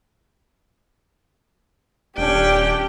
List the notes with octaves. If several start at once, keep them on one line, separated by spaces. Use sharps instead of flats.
D#1 C#4 D4 G4 G5